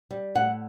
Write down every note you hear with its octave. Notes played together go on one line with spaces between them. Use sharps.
G3
A2 F#5